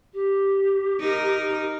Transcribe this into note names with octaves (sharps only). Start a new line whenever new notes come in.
G4
D#4 A#4